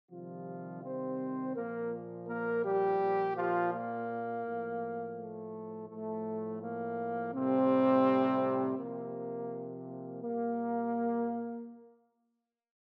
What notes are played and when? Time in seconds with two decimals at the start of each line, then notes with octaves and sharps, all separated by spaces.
0.10 C3 D#3 F3 G3 F4
0.83 C4 C5
1.55 A#2 F3 A#3 A#4
2.28 A#3 A#4
2.64 G3 G4
3.00 A#2 F3
3.36 F3 F4
3.72 A#3
4.44 A2 F3
5.16 A3
5.89 A2 F3 A3
6.61 A#3
7.33 A2 C3 G3 C4
8.78 C3 F3 A#3
9.86 A#3
10.22 A#2 G3 A#3